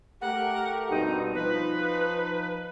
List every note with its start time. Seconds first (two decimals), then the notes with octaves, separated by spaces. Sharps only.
0.21 A3 G4 A#4 F#5
0.90 G2 B2 C4 D#4
1.34 F3 D#4 B4